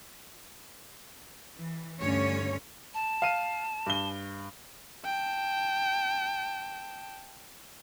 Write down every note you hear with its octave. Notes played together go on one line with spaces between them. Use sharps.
E3
D2 G2 D3 C#4 C#5
A5
F5 D#7
G2 G7
G5 A5